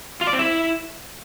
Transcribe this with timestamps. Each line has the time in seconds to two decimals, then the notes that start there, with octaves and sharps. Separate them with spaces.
0.21 F4
0.27 D5
0.33 C4
0.39 E4